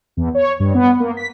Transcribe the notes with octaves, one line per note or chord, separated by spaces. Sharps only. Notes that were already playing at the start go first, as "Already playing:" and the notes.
E2
C#5
G2
B3
A#3
B6